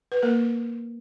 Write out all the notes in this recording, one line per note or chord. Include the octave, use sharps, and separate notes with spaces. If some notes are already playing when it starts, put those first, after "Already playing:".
B4
A#3 A#4